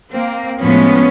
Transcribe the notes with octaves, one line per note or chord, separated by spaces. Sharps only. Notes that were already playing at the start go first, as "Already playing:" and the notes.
A#3 C4
A2 F3 G#3 B3 C#4